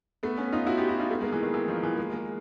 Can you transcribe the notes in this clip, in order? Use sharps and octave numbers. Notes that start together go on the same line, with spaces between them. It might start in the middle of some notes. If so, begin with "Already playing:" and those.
A3 B3
B3 C#4
D#4 F4
E4 F#4
F4 G4
E4 F#4
D#4 F4
A3 B3
G#3 A#3
E3
D#3
E3
D#3 F3
E3
G#3 A#3
G#3 A#3